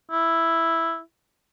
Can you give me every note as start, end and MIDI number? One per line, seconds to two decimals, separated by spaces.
0.11 1.00 64